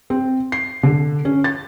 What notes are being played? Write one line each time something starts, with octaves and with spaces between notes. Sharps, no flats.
C4
C7
D3
C#4
A6